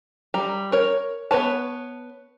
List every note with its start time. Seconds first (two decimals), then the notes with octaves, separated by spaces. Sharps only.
0.34 G3 A#5
0.72 A#4 C#5
1.31 B3 B4 C#5 A5